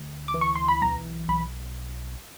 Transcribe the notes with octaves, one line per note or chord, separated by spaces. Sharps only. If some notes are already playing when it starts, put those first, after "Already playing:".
Already playing: D2
D6
E3
C#6
C6
B5
B1 A#5
B1 B5